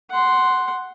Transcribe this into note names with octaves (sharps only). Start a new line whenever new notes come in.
F#5 C6